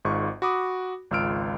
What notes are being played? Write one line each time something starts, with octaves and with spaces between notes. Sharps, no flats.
G#1 G#2 F4 C#6
F#4 B5 D6 D#6
G#1 C#2 F4 E6 F6 D7